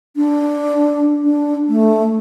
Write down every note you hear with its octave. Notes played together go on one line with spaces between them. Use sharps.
D4
D4
A3